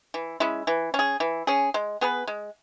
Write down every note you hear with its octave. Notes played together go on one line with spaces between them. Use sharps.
E3
G#3 C#4 E4
E3
C#4
G#4
E3
C#4 G#4
G#3
B3 G#4 B4
G#3